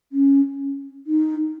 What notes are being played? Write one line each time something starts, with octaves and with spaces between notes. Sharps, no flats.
C#4
D#4